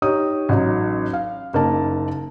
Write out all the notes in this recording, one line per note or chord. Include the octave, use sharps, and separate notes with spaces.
D#4 G4 C#5 D#6
A1 F#3 D#4
F5
F#1 A#3 D#4 A5